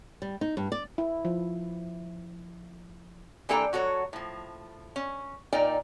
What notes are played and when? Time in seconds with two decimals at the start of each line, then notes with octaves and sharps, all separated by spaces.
0.22 G3
0.41 D#4
0.57 G2
0.72 D5
0.98 E4
1.25 F3
3.49 E3 A#3 D4 A4 G5 A#5
3.73 F#3 F#4 A4 C#5
4.13 A2 F3
4.96 C#4
5.53 A#2 D#4 A#4 D5 G5 A#5